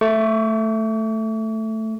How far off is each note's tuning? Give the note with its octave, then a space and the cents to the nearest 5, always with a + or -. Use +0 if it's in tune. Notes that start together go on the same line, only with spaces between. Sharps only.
A3 +0 C#6 +45